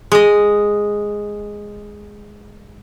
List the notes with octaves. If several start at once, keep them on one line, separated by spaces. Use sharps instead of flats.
G#3 D#5